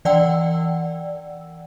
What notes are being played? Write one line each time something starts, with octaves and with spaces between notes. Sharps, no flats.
E3 D5 F#5 G5 E6